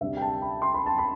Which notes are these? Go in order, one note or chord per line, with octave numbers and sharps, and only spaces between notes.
D2 C3 G3 E5
G5
A5
B5
C6
B5
A5
B5